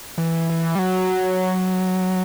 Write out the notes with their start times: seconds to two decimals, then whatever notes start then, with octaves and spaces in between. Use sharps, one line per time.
0.18 E3
0.50 E3
0.75 G3
0.79 F#3